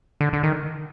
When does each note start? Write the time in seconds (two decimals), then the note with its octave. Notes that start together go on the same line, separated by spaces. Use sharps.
0.21 D3
0.33 D3
0.43 D#3